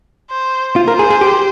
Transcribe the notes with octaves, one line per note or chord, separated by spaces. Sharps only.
C5
F4 C5
A#4
G#4
G#4
G4